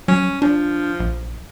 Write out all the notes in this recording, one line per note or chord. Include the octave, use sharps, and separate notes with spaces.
F#3 C#4
F3 D4
A#1